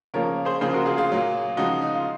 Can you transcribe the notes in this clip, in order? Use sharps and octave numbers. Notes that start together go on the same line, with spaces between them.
C#3 F3 A#3 A#4 C#5
G#4 C5
C#3 F3 A#3 G#4 C5
F#4 A#4
F4 G#4
F4 G#4
A#2 F#3 A#3
C#3 F3 G#3 D#4 F#4
D#4
F4